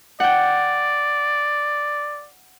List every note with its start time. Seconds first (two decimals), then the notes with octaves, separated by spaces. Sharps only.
0.20 D5 F#5 G5